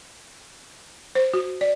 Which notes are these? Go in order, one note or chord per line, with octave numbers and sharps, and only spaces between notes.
C5
F#4
D5